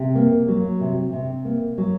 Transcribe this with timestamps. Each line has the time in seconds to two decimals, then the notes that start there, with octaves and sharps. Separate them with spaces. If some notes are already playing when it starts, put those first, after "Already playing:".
Already playing: C3
0.15 A#3
0.48 F#3
0.80 C3
1.13 C3
1.45 A#3
1.78 F#3